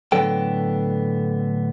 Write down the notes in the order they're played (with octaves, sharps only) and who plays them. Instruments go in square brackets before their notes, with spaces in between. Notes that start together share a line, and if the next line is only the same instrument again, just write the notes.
[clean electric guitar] A2 D3 F#3 B3 A4 G5